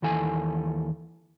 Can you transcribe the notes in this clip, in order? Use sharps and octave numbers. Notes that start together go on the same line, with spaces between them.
D#2 E3 A4 G#5